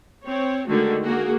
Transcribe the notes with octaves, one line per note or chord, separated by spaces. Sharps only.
C4 C#5
D3 D#3 G#3 A3 F#4
A#3 F#4 G#4